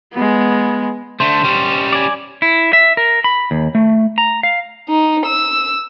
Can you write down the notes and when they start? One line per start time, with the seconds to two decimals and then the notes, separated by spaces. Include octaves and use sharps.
0.13 G#3 B3
1.20 D3 A3 C5
1.43 G3 C#4
1.93 D5 G#5
2.42 E4
2.73 E5
2.97 A#4
3.24 B5
3.51 D#2
3.75 A3
4.18 A#5
4.43 F5
4.89 D#4
5.25 E6